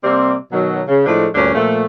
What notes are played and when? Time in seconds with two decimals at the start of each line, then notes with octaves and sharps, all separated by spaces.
0.04 C3 G3 A#3 C4
0.51 B2 D#3 F#3
0.88 C#3
1.06 A2 F3 G#3 A3 D4
1.35 D2 G2 A#2 C#4 D4
1.54 A#2 F3 A3